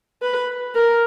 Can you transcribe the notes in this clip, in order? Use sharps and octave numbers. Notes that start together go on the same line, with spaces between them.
B4
A#4